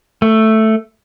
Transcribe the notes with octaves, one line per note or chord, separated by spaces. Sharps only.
A3